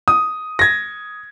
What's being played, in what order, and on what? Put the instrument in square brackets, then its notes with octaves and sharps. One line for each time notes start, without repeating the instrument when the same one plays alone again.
[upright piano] D#6
[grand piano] G#6 A#6